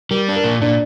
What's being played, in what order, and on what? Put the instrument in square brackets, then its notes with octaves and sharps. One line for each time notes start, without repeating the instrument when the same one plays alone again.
[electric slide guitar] G3 [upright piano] A#4
[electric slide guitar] D4
[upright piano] A#4
[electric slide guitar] A#2
[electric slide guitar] A#2 [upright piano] D4